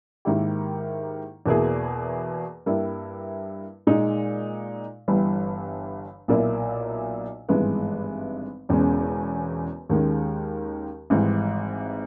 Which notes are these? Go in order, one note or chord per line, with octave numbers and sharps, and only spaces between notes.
G#2 D#3 A#3 E4 G4
E2 B2 A#3 E4 G#4
G2 G3 A#3 E4
A#2 G#3 D#4
G1 G2 E3 G3
B1 A#2 A#3 E4
G#1 G2 E3 G#3 B3
E1 E2 C#3 G#3 C#4
D#2 D#3 G#3 C#4
G#1 G#2 E3 G3